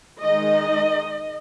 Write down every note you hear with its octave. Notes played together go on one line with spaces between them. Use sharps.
D#3 G#3 D#4 D#5